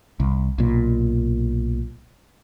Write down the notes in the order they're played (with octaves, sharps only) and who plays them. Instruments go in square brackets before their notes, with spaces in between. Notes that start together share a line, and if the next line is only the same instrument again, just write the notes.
[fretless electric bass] C2
B1 A#2